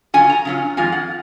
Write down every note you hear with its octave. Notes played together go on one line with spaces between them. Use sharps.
C#3 F#3 C#4 F4 G#5
A#5
C#3 F#3 C#4 F4
F2 D#3 G#3 F4 G#5
F#5